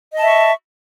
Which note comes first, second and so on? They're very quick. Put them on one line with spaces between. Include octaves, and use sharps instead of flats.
D#5 A5 E5 C#6